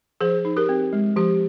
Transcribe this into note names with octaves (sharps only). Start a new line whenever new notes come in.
F3 G#4 C5
D#4
G4 A#4
C4
G#3
F3 G4